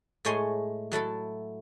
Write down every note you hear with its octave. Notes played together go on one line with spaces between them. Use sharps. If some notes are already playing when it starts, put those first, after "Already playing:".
A2 G#3 A3 C#5 G#5 C6
F#3 A3 E4 A4